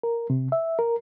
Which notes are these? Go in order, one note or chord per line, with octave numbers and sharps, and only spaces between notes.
A#4
C3
E5
A#4